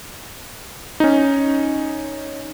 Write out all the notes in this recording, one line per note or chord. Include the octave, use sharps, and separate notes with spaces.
C#4 D#4